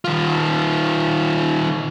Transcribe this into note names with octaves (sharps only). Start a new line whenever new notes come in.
D#3 F4